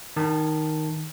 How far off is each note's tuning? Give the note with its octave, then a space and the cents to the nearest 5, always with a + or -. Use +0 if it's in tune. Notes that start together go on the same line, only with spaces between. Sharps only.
D#3 +0 A5 +0